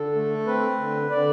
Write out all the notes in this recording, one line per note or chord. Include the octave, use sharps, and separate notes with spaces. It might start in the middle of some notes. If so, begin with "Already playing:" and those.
Already playing: D3 A4
A3
C4 B4
D3
D3 D5